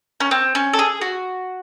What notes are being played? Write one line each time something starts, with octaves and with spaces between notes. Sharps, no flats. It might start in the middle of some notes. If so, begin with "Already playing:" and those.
C#4
C4
C#4
A4
G#4
F#4